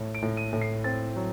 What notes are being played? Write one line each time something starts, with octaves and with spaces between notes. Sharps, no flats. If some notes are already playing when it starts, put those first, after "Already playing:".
Already playing: A2
D7
A2
D#7
A2
C7
C4 A6
F#3